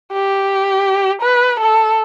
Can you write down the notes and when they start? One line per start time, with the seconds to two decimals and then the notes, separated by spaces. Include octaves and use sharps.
0.12 G4
1.22 B4
1.60 A4